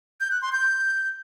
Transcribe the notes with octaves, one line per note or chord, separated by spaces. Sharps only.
G6
F#6
C6
G6